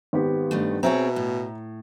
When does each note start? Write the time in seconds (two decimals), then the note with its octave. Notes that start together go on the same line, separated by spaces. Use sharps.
0.13 G#1 B3 G4
0.51 G2 D#3 A3
0.83 B2 C4 G#4 C#5 E5 A#5
1.16 A2